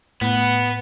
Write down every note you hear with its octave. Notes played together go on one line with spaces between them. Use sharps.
A2 B3